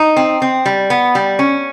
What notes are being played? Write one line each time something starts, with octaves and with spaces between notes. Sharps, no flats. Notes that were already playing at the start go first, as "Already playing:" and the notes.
Already playing: D#4
C4
C4
G3
B3
G3
C#4